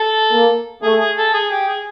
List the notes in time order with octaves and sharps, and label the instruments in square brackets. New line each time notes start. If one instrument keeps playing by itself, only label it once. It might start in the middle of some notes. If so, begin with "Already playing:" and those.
Already playing: [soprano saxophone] A4
[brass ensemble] A#3
[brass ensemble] A3 [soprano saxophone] G#4
[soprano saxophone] G#4
A4
G#4
G4
G#4